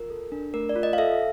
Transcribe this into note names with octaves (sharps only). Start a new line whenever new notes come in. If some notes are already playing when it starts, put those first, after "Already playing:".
Already playing: F4 A#4
A4
D4
A3 A#4
D5
F4
D#5
F5
A4 E5